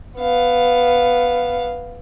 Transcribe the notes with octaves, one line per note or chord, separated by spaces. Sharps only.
B3 F5